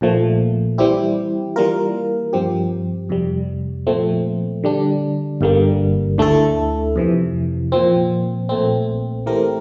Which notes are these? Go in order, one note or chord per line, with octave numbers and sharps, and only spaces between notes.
A#1 A#2 F3 A3
E3 G3 C4 E4 G4
E3 G3 A#3 F4 A#4
G2 F3 C4 G4
F2 C3 G3
A#2 F3 A3 C4
D3 G3 D4
G1 G2 D3 G3 A#3
D2 D3 A3 E4 A4
F2 C3 E3
A#2 F3 C4
A#1 A#2 A3 C4
E3 A3 C4 G4 A#4